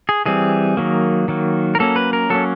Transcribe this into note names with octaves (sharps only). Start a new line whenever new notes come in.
G#4
E3 G3 C4 G#4
D#3 F#3 A#3
D#3 F#3 A#3
A#4
F#3 A#3 C#4 A4
B4
A#4
F#3 A#3 C#4 A4